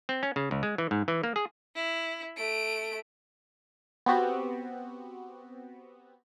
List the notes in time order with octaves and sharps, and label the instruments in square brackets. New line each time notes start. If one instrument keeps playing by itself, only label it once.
[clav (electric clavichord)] C4
C#4
C#3
C#2
G#3
E3
G#2
E3
A#3
G#4
[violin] E4
A3 D7
[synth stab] B3 C4 F#4 G4